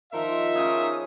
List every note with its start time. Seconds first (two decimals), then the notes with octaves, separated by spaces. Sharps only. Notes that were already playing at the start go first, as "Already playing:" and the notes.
0.13 D#3 F3 D#4 A#4 E5
0.55 C#3 C#4 D#6